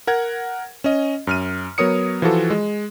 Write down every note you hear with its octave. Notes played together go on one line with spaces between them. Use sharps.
A#4 F#5 G#6
C#4 D#5
F#2 F6 D#7
F#3 B3 A#4 C#5 D#6 C#7
E3 F3 F4 F#4 A4
G#3